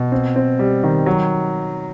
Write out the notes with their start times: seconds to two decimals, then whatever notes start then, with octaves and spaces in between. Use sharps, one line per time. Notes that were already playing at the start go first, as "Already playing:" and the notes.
Already playing: B2
0.12 C4
0.36 C4
0.59 G3
0.83 D#3
1.06 F#3